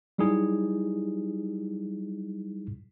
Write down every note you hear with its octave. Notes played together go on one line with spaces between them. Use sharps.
F#3 G3 D#4 E4 G#4